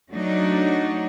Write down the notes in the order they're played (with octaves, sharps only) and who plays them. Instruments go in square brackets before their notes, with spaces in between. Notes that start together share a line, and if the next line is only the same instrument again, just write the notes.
[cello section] F#3 A3 D4 D#4 F#4